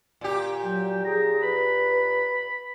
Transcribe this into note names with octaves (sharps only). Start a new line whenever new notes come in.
A#2 G4
F#3 G5
G#4 A#5
B4 B5